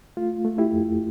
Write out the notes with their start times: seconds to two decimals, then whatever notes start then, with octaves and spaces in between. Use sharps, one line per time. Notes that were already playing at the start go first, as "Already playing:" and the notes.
0.17 A3 F4
0.45 A3
0.58 E4 G4
0.73 F2